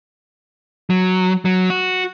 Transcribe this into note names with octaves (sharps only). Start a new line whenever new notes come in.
F#3
F#3
F#4